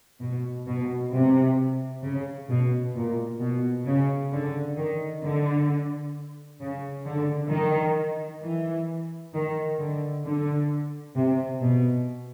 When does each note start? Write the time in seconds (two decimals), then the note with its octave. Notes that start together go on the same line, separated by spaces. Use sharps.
0.20 B2
0.67 B2
1.12 C3
2.03 C#3
2.49 B2
2.95 A#2
3.40 B2
3.85 C#3
4.32 D3
4.77 D#3
5.23 D3
6.60 C#3
7.05 D3
7.51 D#3
8.42 E3
9.33 D#3
9.79 D3
10.24 D3
11.15 C3
11.62 B2